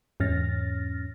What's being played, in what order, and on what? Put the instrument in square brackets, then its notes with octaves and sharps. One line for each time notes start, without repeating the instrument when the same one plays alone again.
[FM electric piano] E2 G#2 C#4 F6 A6 A#6